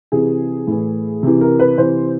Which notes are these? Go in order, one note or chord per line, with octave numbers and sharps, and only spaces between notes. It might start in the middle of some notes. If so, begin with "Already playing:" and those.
C3 E3 G#4
A2 E3
C3 E3
A#4
B4
C3 E3 C5